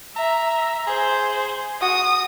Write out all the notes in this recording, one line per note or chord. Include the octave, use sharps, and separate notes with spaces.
E5 A#5
G#4 C5
F#4 D#6